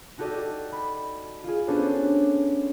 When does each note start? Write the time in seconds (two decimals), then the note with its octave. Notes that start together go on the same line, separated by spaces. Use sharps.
0.18 D#4 F#4 G4 A4 D5 D#5
0.72 B5
1.44 F4 G#4
1.68 B3 C#4 D4 F#4 A4 C5